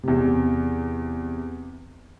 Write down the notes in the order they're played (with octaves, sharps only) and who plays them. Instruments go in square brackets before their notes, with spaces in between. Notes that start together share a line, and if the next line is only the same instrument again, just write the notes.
[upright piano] E2 C3